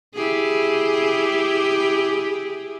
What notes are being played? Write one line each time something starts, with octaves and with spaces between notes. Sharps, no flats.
E4 G4 G#4